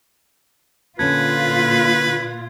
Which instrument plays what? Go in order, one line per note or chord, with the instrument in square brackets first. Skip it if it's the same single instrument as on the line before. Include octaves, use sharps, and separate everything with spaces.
[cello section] A#2 F4 [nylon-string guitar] D3 C#4 A4 [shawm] B4 [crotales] G#6